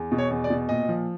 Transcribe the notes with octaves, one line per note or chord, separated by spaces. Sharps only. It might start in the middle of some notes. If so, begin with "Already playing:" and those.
Already playing: E2
B2
C#5
E2
D5
B2
A#2 D#5
F3